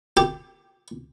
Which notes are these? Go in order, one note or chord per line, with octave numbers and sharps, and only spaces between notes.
G4